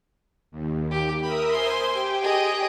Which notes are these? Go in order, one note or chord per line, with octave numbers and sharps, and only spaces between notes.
D#2
G4
A#4 E5 B5 D#6
C5 G#5 C6
G4 G5
G#4 D#5